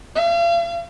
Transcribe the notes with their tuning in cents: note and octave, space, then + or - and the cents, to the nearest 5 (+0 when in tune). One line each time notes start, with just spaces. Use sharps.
F5 -40